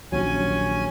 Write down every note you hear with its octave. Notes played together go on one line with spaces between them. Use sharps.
A#1 D#2 F#3 C#4 G#5